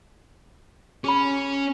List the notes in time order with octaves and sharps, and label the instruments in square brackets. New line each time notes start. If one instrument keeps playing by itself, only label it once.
[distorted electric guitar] C#4 [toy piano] G#4 B5